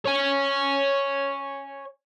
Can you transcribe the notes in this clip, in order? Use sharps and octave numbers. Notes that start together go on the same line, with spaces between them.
C#5 G#5